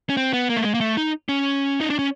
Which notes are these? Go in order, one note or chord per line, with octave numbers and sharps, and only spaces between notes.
C#4
C4
B3
A#3
A3
G#3
A#3
A3
D#4
C#4
D#4
D4
C#4